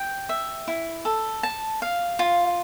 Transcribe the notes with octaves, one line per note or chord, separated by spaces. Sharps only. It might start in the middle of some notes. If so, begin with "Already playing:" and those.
Already playing: G5
E5
E4
A4
A5
F5
F4